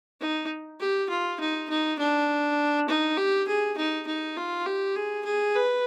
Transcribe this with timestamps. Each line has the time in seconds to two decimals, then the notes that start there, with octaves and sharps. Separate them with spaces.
0.20 D#4
0.80 G4
1.10 F4
1.40 D#4
1.70 D#4
1.99 D4
2.88 D#4
3.17 G4
3.47 G#4
3.77 D#4
4.06 D#4
4.37 F4
4.66 G4
4.95 G#4
5.25 G#4
5.55 B4